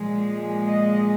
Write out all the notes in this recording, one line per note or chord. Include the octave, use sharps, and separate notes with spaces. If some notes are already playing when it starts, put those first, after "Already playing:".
Already playing: A#2 F3 G#3
D#5